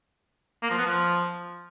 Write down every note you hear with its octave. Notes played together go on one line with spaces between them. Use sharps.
A#3
F3
B3
F3